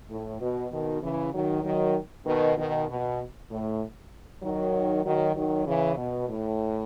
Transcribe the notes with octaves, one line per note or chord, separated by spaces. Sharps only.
A2
B2
B2 D#3
C#3 E3
D#3 F#3
D#3 F#3
B2 D#3
B2 D#3
B2
A2
D#3 F#3
D#3 F#3
D#3 F#3
C#3 E3
B2
A2